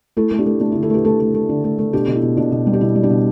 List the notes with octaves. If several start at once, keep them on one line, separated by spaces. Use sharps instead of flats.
A3 E4 A4
A3
D4 G4
A3
A3 D4
E4
D3
E4 A4
A3 G4 B4
A3 E4 A4
A3
A3
D3
A3
A3
B2 D4 G4
B2
E4
B2
B2 D4
B2
G3
G4
B2 E4
G3
D4 G4
B2